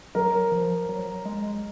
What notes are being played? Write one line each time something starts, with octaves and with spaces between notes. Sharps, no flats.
F#3 A#4
F3
F#3
G#3